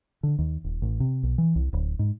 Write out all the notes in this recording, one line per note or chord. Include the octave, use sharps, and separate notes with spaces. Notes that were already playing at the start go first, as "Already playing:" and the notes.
D3
D#2
D#1
A1
C3
B1
E3
C2
D1
G#2